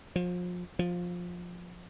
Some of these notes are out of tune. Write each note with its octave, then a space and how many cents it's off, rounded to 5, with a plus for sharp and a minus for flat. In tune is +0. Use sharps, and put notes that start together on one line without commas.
F3 +30
F3 +15